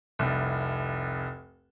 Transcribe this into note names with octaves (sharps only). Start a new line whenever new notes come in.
F1 C2